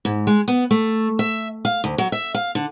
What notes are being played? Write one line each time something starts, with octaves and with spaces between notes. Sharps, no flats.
G#2
G#3
B3
A3
E5
F5
D2
F#3
E5
F5
D3